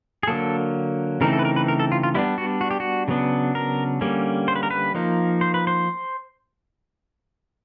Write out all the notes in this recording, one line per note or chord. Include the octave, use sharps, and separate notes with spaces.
G#4
D3 F#3 A#3 A4
C#3 E3 A3 C4 D#4 A#4
A4
B4
A#4
B4
A#4
A4
F4
F4
G3 B3 D4 E4
F#4
F#4
G4
F#4
C#3 F#3 B3 D4
A#4
D3 G3 A#3 C#4
C5
B4
A#4
B4
F3 A#3 D#4
C5
B4
C5